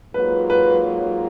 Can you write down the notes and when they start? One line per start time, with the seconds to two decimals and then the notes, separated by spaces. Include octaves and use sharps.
0.14 G#2 F#3 A#3 F4 B4
0.50 B4